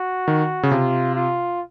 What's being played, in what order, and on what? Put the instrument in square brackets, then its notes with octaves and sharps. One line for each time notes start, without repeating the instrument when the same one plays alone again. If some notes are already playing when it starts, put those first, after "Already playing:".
Already playing: [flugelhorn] F#4
[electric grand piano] D#3
C#3
[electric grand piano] C3 [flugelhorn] F4
[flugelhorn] F4